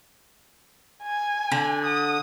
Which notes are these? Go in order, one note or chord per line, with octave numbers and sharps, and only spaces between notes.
G#5
D3
D#6